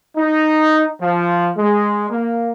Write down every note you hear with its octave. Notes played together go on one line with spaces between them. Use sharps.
D#4
F3
G#3
A#3